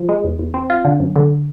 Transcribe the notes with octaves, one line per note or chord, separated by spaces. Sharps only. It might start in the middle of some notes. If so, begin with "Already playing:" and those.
Already playing: F3
G#3
E2
E2
C4
F4
D3
F#2
D3